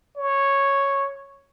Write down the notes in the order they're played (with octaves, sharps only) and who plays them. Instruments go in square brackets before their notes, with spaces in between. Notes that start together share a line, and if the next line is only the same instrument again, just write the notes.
[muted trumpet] C#5